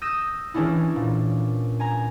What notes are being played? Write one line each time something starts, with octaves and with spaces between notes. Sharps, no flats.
D#6 E6 G6 A#6 D#7 E7
E3 G#3 C#4 D4 E4
A#2
G#5 A#5